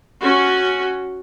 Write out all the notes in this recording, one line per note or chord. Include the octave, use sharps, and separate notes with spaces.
C#4 F#4